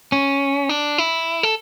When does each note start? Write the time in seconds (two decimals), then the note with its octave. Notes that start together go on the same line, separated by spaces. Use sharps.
0.12 C#4
0.69 D4
0.98 E4
1.43 A4